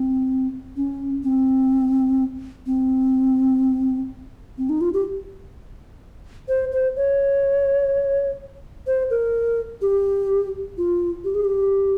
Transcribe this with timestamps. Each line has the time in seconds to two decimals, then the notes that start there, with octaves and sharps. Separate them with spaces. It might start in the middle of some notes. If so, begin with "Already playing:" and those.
Already playing: C4
0.77 C#4
1.24 C4
2.66 C4
4.58 C4
4.69 D#4
4.81 F4
4.93 G4
6.48 C5
6.72 C5
6.96 C#5
8.87 C5
9.10 A#4
9.82 G4
10.78 F4
11.24 G4
11.35 G#4
11.45 G4